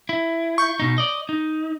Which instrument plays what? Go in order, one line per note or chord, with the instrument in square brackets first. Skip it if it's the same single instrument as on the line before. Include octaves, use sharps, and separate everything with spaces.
[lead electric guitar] E4
[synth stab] C#6 G6
[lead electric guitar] B2 D#4
D5 D#5
D#4